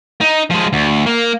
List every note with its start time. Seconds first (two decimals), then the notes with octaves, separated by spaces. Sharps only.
0.21 D#4
0.51 F3 G#3
0.73 D2
1.06 A#3